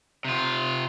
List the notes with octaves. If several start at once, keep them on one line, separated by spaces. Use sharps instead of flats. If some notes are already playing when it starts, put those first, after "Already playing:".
C3 F4